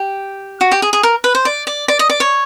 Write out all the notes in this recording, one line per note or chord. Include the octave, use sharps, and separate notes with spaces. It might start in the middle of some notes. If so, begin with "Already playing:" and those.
Already playing: G4
F#4
G4
G#4
G#4
A#4
B4
C5
D5
D5
D5
D#5
D5
C#5